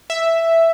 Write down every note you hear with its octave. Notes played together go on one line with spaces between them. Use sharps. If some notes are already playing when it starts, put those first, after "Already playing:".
E5